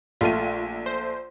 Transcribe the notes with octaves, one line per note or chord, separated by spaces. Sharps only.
A#1 A3 F4 D#7
C5